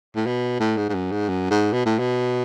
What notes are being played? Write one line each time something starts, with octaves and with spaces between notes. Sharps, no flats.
A2
B2
A2
G#2
G#2
F#2
G#2
F#2
G#2
B2
A2
B2